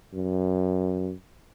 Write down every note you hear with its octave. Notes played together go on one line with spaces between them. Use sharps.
F#2